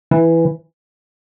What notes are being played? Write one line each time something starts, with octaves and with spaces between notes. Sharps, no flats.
E3